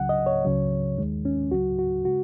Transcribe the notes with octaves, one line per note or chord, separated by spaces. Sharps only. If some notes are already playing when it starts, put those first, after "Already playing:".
Already playing: C#2 C#3 F#3 F#5
D#5
C#5
C#2 C#3 F#3
D#2 D#3 G#3
C#4
C#2 C#3 F#3 F#4
F#4
C#3 G#3 F#4